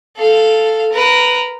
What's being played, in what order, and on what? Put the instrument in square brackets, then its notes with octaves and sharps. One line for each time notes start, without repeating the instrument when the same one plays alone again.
[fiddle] A4 F5
A#4 B4